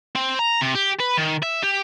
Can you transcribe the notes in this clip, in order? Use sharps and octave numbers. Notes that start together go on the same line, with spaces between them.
C4
A#5
C3
G4
B4
D#3
E5
G4